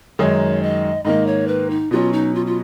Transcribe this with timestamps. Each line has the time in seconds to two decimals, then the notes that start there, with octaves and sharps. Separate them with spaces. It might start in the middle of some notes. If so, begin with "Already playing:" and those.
0.19 F#2 D#3 G#3 D#4 C#5
0.63 D#5
1.05 G#2 D#3 A#3 D#5
1.27 C#5
1.48 B4
1.70 D#4
1.91 B2 F#3 C#4 F4
2.13 D#4
2.35 F4
2.46 F4